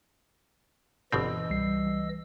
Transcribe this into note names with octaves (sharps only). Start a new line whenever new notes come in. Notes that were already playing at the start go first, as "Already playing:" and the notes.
G1 B2 E3 C4 D#5 E6
C2 G3 C7